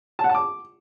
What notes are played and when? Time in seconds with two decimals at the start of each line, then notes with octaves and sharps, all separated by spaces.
0.19 A5
0.24 F#5
0.29 A5
0.35 D6